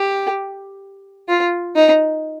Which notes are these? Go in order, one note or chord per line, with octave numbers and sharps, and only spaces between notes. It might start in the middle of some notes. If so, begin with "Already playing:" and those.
Already playing: G4
F4
D#4